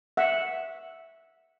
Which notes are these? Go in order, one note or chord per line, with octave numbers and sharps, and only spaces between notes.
E5 F#5